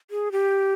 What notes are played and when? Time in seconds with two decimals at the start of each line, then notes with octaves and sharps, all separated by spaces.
0.11 G#4
0.32 G4